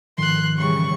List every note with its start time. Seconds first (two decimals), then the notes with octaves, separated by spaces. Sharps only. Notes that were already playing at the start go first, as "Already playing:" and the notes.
0.18 G#2 D#3 F3 C6 F#6
0.58 C#3 E3 G3 C#6